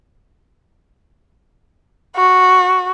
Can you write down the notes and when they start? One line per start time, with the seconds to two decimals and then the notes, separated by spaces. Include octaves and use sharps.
2.16 F#4